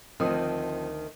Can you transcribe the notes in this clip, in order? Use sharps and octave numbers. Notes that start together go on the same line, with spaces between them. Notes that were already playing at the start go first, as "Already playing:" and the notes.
D2 D#3 F3 C4 D#6